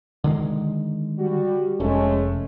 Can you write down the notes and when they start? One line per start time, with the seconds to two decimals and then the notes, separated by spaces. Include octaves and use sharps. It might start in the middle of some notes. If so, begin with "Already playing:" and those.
0.24 D3 D#3 G#3
1.19 G3 F#4
1.80 F1 G#3 A3 C#4